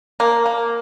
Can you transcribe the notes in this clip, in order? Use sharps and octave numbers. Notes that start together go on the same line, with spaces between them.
A#3
A#3